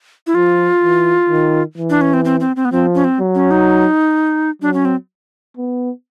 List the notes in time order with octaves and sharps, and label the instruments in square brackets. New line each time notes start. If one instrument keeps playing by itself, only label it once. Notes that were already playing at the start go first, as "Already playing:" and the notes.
[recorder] E4
[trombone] F3 [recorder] F4
[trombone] E3
D#3
E3
[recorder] D4
C#4
C4
C4
C4
C4
B3
[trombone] F3 [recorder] C4
[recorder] C#4
C4
[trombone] F#3
[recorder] C#4
D#4
[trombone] F#3 [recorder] D4
[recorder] C#4
C4
[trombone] B3